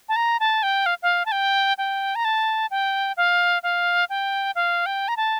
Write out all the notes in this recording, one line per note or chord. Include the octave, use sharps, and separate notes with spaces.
A5
A#5
A5
G5
F5
F5
A5
G5
G5
A#5
A5
G5
F5
F5
G5
F5
G5
A#5
A5